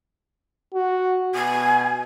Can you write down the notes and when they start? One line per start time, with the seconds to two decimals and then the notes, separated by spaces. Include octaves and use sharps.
0.74 F#4
1.34 B2 G#5